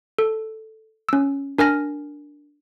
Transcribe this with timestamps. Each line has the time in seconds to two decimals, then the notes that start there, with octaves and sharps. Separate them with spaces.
0.18 A4
1.09 C#4 E6
1.58 D4 A#4 G#5 F6 A#6